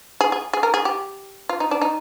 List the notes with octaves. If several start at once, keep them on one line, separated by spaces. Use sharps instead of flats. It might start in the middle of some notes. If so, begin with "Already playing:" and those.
G#4
G#4
G#4
A#4
G#4
G4
F4
D#4
D4
D#4